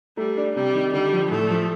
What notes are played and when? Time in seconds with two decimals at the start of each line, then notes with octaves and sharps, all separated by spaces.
0.17 G3 A3
0.37 D4
0.55 C3 G3
0.74 D#3
0.93 D3 G3
1.12 F3
1.31 A2 A3
1.50 F3